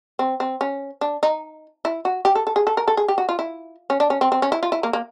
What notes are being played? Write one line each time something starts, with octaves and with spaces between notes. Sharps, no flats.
C4
C4
C#4
D4
D#4
E4
F#4
G4
A4
A4
G#4
A4
A#4
A4
G#4
G4
F#4
F4
E4
C#4
D4
C#4
C4
C4
C#4
E4
F4
E4
A#3
A#3